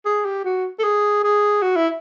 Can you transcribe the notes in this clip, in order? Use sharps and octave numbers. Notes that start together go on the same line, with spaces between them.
G#4
G4
F#4
A4
G#4
G#4
F#4
E4